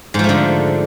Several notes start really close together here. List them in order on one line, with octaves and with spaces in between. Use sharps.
G#2 F3 A3 D3